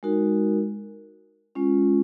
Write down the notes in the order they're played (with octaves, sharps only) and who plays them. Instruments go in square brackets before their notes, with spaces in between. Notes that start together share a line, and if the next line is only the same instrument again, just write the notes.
[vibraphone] G#3 D#4 F#4 A#4
G#3 C#4 F4